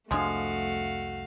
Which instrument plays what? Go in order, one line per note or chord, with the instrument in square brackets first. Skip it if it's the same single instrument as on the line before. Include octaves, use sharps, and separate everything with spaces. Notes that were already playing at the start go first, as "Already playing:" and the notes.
[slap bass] C2 F2 D4 [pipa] F3 G#3 [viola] A3 [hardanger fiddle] F#4 F5